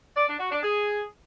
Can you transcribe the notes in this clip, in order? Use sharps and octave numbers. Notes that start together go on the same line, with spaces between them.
D5
D4
F#4
D4
G#4